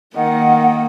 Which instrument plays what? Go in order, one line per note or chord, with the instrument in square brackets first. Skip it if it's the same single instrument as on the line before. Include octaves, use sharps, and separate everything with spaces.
[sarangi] D#3 [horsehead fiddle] A#3 [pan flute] F#5